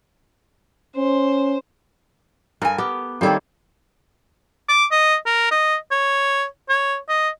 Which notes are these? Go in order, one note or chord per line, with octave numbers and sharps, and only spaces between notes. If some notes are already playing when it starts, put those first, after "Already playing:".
C#4 C5
G2 A4 A#4 G#5
B3 G4
D#3 G3 A#3 C4 A4 C#5
D6
D#5
A#4
D#5
C#5
C#5
D#5